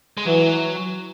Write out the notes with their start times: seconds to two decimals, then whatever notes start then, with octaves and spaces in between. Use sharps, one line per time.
0.17 G#3
0.26 E3 F#3